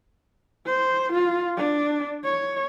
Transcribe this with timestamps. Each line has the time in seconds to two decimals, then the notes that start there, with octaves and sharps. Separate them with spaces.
0.66 C5
1.13 F4
1.57 D4
2.25 C#5